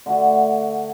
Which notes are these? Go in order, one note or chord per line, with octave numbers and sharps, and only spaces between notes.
D3 A3 F#4